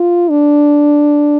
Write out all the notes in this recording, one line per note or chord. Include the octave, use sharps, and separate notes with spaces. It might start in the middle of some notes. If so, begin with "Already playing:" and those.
Already playing: F4
D4